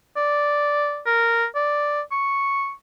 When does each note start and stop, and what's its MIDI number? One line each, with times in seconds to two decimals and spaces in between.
0.16 1.01 74
1.06 1.45 70
1.55 2.01 74
2.12 2.72 85